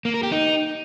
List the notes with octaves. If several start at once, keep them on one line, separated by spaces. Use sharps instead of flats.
A#3
A#4
G4
D#4